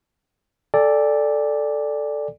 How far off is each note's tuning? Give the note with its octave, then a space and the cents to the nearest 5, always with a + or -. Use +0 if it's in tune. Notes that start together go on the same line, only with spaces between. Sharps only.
A4 +0 D5 +0 G#5 -45